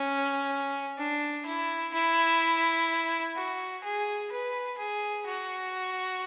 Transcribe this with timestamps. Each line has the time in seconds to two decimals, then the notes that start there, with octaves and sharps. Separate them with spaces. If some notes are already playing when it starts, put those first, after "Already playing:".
Already playing: C#4
0.98 D4
1.45 E4
1.93 E4
3.36 F#4
3.83 G#4
4.31 B4
4.78 G#4
5.26 F#4